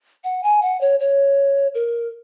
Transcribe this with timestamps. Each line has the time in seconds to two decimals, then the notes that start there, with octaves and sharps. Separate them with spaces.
0.24 F#5
0.43 G#5
0.62 F#5
0.81 C#5
1.00 C#5
1.74 A#4